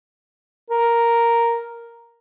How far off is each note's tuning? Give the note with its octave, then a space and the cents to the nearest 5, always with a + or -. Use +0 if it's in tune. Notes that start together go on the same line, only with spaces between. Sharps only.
A#4 +0